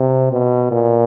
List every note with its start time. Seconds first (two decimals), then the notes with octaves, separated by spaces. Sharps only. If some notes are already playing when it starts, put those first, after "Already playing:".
Already playing: C3
0.32 B2
0.72 A#2